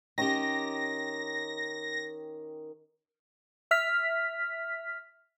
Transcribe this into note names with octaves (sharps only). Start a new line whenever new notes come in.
D#3 C#4 G4 A#6
E5 F6 B6